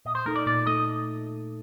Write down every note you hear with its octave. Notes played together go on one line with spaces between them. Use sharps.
A#2 D#5
C5
A3 D#4 A4 A#4
D5
A#2 D5
A3 D#4 A4 D#5